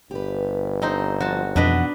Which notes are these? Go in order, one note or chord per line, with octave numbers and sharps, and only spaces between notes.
G1 G4 B4
C4 D#4 C5
F3 F#4 A5
F2 B2 E3 D4 B4 D#5 F#5